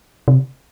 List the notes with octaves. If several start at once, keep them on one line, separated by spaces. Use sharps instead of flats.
C3